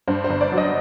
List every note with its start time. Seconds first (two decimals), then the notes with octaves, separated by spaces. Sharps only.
0.08 G2 C5
0.24 C5
0.30 G1
0.41 D5
0.52 F#3
0.57 D#5